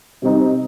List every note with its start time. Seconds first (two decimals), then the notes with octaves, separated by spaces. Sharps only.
0.22 C3 G3 C4 D#4